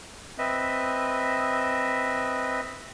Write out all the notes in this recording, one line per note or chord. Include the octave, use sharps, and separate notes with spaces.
C4 B4 D#5 E5